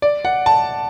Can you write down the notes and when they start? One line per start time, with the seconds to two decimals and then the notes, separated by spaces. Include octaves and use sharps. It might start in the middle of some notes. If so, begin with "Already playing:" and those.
0.02 D5
0.25 F#5
0.46 A5